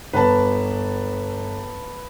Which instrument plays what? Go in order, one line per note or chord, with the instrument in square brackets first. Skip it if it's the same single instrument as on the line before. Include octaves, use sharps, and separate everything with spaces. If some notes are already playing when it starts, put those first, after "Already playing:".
[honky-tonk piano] G1 [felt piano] B4 A5